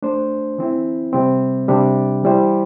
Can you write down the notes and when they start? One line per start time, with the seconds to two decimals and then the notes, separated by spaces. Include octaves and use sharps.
0.02 A3 D4 C5
0.58 E3 C4 E4
1.13 C3 G3 C4
1.68 C3 G3 D4 G4
2.24 E3 G3 E4 C5